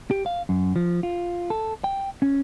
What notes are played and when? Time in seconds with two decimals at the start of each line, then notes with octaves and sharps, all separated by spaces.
0.11 G4
0.26 F5
0.49 F#2
0.76 F3
1.03 F4
1.50 A4
1.84 G5
2.22 C#4